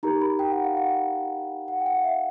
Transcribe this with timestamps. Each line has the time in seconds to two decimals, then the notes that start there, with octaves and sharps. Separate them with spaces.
0.03 D#4 G4 A#4 A#5
0.21 B5
0.39 G5
0.52 F#5
0.64 F5
0.77 F#5
1.68 F#5
1.80 G5
1.86 F#5
1.97 F5
2.04 E5